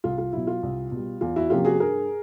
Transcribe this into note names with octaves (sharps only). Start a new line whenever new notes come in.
C2 F4
F4
B2 F#3 E4
F4
C2
B2 G3
E2 F4
E4 F#4
C3 F3 A#3 C#4 F4 G4
F#4 G#4
G2 G#4 A#4